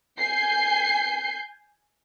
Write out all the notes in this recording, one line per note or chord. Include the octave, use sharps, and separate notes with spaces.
G#5 G6 C7